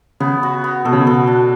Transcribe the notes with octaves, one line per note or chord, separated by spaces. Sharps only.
C#3 B3
F#4
B3
B2 A4
C#3
B2
A4
D4